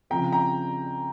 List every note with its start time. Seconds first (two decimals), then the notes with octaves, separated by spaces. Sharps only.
0.10 C#3 F3 C4 G5 A#5
0.32 G5 A#5